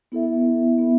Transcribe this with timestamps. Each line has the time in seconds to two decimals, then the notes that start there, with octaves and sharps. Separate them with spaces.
0.12 B3 E4 A4 E5
0.78 B3 E4 A4 E5